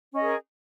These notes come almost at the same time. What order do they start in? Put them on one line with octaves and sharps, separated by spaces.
C#4 D#5 G#4 A#4